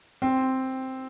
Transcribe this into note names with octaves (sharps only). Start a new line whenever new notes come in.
C4